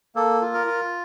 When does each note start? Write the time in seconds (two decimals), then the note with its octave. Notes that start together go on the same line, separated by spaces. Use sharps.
0.15 A#3 A4
0.41 F4
0.54 A#4
0.67 F4